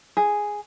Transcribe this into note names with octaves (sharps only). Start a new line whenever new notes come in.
G#4